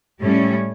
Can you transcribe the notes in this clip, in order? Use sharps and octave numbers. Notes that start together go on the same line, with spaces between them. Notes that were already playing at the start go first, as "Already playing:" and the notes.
A2 G3 C#4